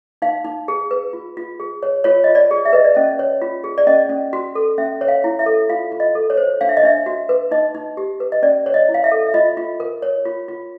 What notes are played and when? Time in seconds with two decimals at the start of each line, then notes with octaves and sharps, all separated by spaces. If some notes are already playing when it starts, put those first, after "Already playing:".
0.22 D#4 F5
0.45 D#4
0.68 G#4
0.91 B4
1.13 F4
1.37 F4
1.60 G#4
1.83 C#5
2.04 F4 C#5
2.24 F4 D#5
2.35 D5
2.51 G#4
2.65 E5
2.73 B4 D#5
2.84 D5
2.95 C#4 D#5
3.19 C#5
3.42 F4
3.64 G#4
3.78 D5
3.87 C#4 D#5
4.09 C#4
4.33 F#4
4.55 A4
4.78 C#4 E5
5.01 C#5
5.08 F5
5.24 E4
5.39 E5
5.46 A4
5.69 F4 F5
5.92 F4
6.00 D#5
6.15 A4
6.30 C#5
6.37 C5
6.61 D4 F5
6.69 E5
6.77 D#5
6.83 D4 E5
7.06 F#4
7.29 B4
7.51 D#4 D#5
7.75 D#4
7.97 G4
8.20 B4
8.32 D#5
8.43 C#4 D5
8.66 C#5
8.74 D#5
8.89 E4
8.94 F5
9.04 E5
9.11 A4
9.27 E5
9.34 F4 D#5
9.57 F4
9.80 A#4
10.02 C#5
10.25 F4
10.48 F4